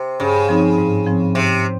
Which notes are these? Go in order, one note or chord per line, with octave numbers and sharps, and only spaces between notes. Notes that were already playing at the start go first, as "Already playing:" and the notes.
Already playing: C3
G2 C#3
F3 C4 D#4
G#2
F3 C4
G#2 C3